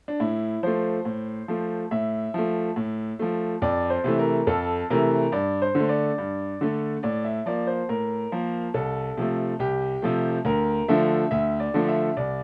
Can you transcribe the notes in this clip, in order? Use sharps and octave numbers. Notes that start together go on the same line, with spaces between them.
D4
A2 E4
F3 A3 C5
A2
F3 A3
A2 E5
F3 A3
A2
F3 A3
F2 D5
C5
C3 E3 A3
A#4
F2 A4
C3 E3 A3 A#4
G2 D5
C5
D3
A3
D5
G2
D3 A3
A2 D5
E5
F3 A#3 D5
C5
A2 A#4
F3 A#3
C2 A4
C3 F3 A3
C2 G4
C3 F3 A3
D2 A#4
D3 F3 A3 E5
D2 E5
D5
D3 F3 A3
E5
C2 D5